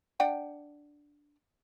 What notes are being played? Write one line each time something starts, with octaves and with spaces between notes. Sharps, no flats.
D4 F#5 G5